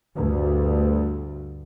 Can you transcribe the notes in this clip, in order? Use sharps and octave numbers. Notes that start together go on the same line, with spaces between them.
D2 G2